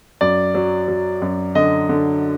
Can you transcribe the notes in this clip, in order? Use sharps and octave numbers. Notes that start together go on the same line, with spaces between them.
F#2 D5
F#3
F#3
F#2
D3 D#5
D3